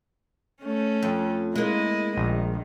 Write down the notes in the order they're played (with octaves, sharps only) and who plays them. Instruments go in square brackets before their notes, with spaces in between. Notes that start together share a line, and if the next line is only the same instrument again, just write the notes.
[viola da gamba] A3 C#4
[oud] F2
[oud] G#3 A#3 [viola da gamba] E4 D#5
[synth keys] A#1 [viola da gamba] D#3